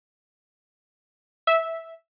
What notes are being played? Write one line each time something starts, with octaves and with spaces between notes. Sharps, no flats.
E5